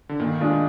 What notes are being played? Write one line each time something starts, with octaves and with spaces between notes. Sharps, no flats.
D3
A#2 D#3
G#3 D4 F4